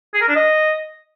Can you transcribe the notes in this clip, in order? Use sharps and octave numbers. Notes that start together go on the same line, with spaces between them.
G#4
A#4
D4
D#5